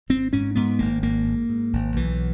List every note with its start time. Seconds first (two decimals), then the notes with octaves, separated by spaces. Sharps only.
0.09 G#1 C4
0.33 G#2 C#4
0.55 G#2 B3
0.79 G#1 A#3
1.03 G#1 A#3
1.26 G#2
1.49 G#2
1.73 G#1
1.96 B1 E3